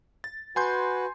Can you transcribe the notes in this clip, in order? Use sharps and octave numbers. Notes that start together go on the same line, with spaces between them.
A6
F#4 B4 G#5 C6 G6